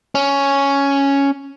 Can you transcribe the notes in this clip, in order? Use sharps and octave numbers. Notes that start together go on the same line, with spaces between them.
C#4